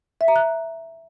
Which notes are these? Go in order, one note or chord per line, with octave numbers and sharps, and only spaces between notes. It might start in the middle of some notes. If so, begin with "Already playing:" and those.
E5
A#5
F#6